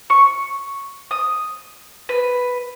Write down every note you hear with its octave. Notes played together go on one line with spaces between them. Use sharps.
C#6
D#6
B4